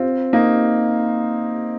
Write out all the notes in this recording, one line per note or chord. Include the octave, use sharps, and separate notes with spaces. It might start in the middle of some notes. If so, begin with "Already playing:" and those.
Already playing: C4 F4
A#3 D#4